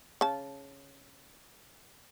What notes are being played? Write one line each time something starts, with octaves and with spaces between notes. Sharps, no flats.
C#3 A5